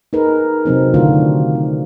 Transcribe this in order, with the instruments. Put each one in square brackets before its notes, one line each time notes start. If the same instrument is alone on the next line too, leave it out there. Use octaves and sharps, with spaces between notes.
[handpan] D#4 G#4 A#4 B4
C3 F#3 C4 D#4
D3 D#3 A3 D4 F4 F#4
C4